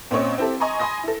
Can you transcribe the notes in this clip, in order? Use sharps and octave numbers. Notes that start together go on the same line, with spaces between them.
A#2 C4 C#4 C#5 D#5
C4 E4 G4 A4
D#5 G#5 A#5 C6 C#6
G#5 B5 C6 D#6 A#6
E4 A4